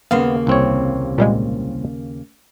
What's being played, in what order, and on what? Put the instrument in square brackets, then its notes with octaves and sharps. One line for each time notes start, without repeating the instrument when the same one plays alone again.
[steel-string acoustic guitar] D#2 C#3 A#3 [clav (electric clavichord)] B3 [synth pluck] F5 C6
[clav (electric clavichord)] C2 C4 C#5
[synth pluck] A#2 G3 G#3